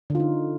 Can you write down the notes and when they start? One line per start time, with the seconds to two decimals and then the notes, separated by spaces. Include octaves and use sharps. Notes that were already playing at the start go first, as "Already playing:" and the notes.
0.10 D3
0.15 F4
0.20 D#4